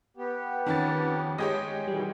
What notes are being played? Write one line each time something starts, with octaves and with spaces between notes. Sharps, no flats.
B3 G4
F2 D#3 C#4 A6
G#3 G4 C#5 G#5 D#6
B2 D#3 E3 G3